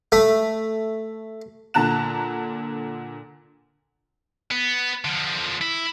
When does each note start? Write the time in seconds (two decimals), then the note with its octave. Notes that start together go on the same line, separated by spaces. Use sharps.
0.12 A3
1.74 A#2 D3 A5 A#5 F#6 E7
4.51 B3
5.05 D3 F3
5.61 E4